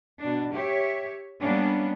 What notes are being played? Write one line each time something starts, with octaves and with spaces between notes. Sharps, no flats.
B2 D4
G4 C#5 E5
G3 A#3 B3 C#4 D4